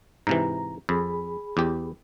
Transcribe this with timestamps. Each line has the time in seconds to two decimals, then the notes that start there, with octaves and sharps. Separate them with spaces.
0.27 G#2 C3 E3 A#5
0.89 F2 G#4 B5
1.57 E2 G4